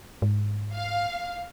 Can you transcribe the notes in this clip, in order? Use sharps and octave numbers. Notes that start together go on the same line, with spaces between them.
G#2
F5